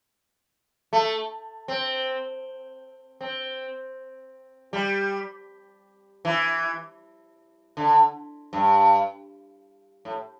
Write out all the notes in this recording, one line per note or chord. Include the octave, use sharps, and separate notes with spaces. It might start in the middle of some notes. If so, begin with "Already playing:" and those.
A3
C4
C4
G3
E3
D3
G2
A2